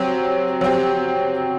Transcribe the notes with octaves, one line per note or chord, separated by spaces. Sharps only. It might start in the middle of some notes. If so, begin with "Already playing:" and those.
Already playing: F#3 C4 G4
F#3 C4 G4